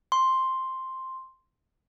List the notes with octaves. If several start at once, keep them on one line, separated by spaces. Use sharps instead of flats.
C6